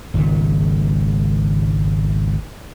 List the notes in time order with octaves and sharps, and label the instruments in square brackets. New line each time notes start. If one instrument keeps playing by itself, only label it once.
[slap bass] G#1 C#2 A#2